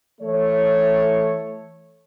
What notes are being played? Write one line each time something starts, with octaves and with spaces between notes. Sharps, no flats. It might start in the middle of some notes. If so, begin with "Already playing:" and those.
E3 A3 C#5